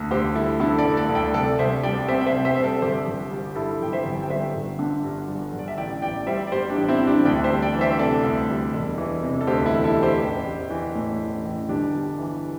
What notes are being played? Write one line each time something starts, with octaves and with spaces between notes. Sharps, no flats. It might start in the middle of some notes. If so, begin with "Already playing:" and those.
Already playing: D2
D2 G4 C5
G3 E4 A4
D3 E4 A4
A4 D5
D2
A4 D5
D2
D5 G5
C2 A4 D5
C2 C5 E5
G3 D5 G5
C3 C5 E5
G5
C5 E5
C2
C5 E5
C2 C5
A4 D5
G1 G4 C5
G1
G3
G2 E4 A4
G1 G5
C5 E5
G1
G5
G1 C5 E5
G1
D3
G2
G1
G1
D5
E5
A1 D5 G5
A1 D5 G5
G3 C5 E5
D5
G2 G4 C5
D4 G4
A1
C4 E4
A1
D4 G4
D2 D5 G5
C5 E5
G3
D5 G5
E3
C5 E5
C3 A4 D5
D2
G3
E1
E3
C3
A4
D2 G4 C5
E4 A4
E1
E4 A4
E3
G4 C5
A1
A1
E3
A2
A1
A1
G1 D4 G4
G3
E3